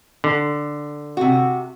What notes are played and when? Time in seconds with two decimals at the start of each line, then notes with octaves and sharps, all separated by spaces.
0.24 D3
1.17 C3 F#4